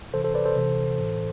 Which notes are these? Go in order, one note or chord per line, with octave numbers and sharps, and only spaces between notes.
C3 E3 A4 C5
A4 C5
B4 D5
A4 C5
C3 E3
A2 E3